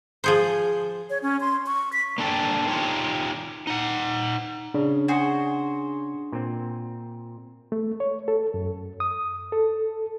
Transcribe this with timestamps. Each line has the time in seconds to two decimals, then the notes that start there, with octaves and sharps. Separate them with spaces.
0.24 F3 G#4 C5
1.10 C#5
1.22 C#4
1.41 C6
1.66 C#6
1.93 B6
2.18 A#3 D4 A4 G5
2.68 D#4 F4 G4 C#5
3.67 D#4 F#5
4.74 C#3 D4
5.08 F#4 G#4 C5
6.32 A#2 C4
7.72 A3
8.00 C#5
8.28 A4
8.54 F#2
9.00 D#6
9.52 A4